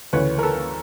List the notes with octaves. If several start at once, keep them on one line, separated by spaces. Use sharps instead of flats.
D2 C#3 E3 B4 C#5
A#4
A4 B4